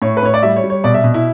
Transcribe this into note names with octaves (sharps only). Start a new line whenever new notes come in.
A2 C#5
B4
A2 C#5
D5
G3 E5
C#5
G3
C#5
B2 D5
E5
B2
E4